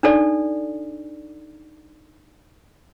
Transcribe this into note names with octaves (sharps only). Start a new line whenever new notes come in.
D4 D#4 A4 D5